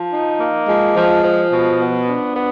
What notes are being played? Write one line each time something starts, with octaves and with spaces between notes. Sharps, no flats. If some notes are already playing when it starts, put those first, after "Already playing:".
Already playing: F3
D#4
A#3
F3 G#3
F3
F3
B2
B3
D4
B3